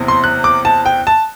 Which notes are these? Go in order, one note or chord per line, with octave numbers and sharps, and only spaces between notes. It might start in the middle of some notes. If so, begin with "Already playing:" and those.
Already playing: F#1 E2 C3
C6
F#6
D6
A5
G5
A5